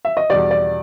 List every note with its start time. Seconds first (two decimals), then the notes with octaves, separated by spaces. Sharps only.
0.05 E5
0.17 D#5
0.30 E2 B2 G3 D5
0.51 D5